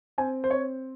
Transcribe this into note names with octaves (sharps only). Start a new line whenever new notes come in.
C4 G#5
C5
C4 C#5